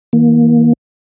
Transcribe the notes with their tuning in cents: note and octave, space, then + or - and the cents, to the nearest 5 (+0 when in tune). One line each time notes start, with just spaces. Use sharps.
E3 -45 A#3 +15